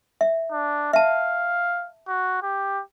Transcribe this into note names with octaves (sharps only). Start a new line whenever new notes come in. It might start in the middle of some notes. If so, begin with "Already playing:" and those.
E5
D4
E5 F5 A5
F#4
G4